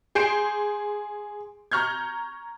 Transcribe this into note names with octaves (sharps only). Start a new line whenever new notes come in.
G#4 C6 G6 C7 D7 E7
A#5 C#6 F6 G6 G#6